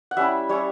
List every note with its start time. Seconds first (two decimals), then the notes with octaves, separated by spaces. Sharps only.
0.11 F#5
0.17 G3 C#4 E4 E5
0.49 G3 C#4 E4 C#5